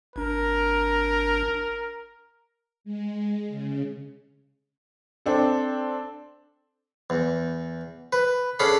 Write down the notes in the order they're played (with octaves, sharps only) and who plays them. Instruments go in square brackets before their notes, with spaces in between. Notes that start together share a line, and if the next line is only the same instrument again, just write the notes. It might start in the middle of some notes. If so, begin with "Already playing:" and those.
[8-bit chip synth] G#1 D4 [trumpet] A#4
[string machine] G#3
C#3
[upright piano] C4 D4 A4
[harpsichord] E2
B4
C#4 D4 G#4 A4 F5 B5